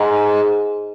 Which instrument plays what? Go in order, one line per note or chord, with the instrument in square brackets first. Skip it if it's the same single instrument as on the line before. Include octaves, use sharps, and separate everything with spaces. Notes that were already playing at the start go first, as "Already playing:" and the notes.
Already playing: [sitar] G#2